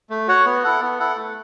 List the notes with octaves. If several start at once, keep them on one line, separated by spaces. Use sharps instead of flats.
A3
F#4 C#5 F#5
B3
E4 A4 F#5
B3
E4 A4 F#5
A3